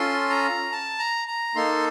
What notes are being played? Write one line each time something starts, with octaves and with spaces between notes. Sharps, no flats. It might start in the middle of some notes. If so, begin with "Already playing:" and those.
Already playing: C#4 F4 A4 C6
A#5
A5
A#5
A#5
A#3 D#4 A4 C6